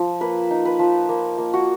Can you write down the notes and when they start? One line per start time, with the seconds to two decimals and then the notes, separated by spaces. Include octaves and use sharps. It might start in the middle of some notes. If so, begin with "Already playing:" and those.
Already playing: F3
0.21 A#3 B4
0.51 D#4
0.65 B4
0.79 F3
1.09 A#3
1.38 A#3
1.54 F#4